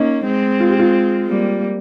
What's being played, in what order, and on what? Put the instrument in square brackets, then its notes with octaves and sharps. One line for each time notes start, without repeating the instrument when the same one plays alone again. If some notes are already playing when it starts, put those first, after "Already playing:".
Already playing: [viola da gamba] A#3 C#4 [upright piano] D#4
[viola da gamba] G#3 C4
[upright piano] F4
G4
F4
[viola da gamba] G3 A#3